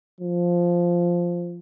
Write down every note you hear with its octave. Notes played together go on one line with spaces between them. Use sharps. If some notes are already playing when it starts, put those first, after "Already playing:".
F3